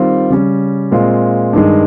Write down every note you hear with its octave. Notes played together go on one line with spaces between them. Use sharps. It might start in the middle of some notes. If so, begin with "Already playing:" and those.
Already playing: D#3 G3 C4 F4
C#3 G3 C#4
A#2 G#3 C4 F4
G2 D#3 G#3